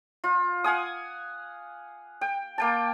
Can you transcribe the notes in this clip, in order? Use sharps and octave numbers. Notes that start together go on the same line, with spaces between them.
F4
F5 F#5 G#5 D#6
G5
A#3 G5 A5